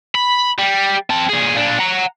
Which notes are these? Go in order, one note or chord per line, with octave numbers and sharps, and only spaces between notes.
B5
G3
C4 A5
A#2 G#4
A#2 D4
F#5 A#5